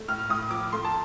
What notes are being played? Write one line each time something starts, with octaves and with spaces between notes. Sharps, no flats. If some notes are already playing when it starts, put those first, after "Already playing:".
Already playing: A3
A2 F6
A2 D#6
F3 D6
A3 C6
A5